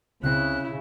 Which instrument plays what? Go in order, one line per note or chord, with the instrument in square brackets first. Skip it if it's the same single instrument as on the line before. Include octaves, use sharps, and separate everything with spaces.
[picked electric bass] C#2 C4 [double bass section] C#3 [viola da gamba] E4 [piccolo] F#6